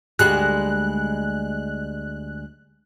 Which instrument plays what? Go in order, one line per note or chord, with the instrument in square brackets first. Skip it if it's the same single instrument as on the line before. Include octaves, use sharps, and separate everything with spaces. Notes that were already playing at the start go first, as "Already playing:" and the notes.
[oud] D2 G3 G#3 [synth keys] F#6